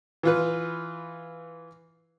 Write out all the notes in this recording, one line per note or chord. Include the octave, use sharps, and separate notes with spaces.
E3 F4 B4